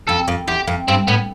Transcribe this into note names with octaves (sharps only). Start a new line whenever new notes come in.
F2 A4
F2
E2 G4
F2
G2 C4
A2 B3